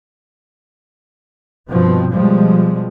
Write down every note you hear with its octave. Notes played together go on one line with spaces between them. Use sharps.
G2 B2 F3 C4
B2 F3 G3 G#3